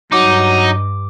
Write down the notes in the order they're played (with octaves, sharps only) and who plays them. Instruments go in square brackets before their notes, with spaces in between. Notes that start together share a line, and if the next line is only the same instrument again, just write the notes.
[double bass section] G2 [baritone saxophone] F#3 [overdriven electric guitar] D#4 [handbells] D6